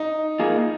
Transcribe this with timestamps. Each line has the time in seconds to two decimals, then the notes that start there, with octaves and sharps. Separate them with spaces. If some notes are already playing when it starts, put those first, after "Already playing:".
Already playing: D#4
0.40 A#3 F4 G#4